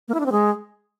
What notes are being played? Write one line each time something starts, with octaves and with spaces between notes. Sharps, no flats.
A#3
E4
D4
C4
G#3